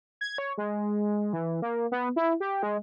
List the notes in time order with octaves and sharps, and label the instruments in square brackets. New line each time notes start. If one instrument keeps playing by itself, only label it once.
[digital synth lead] G#6
C#5
G#3
E3
A#3
B3
E4
G4
G#3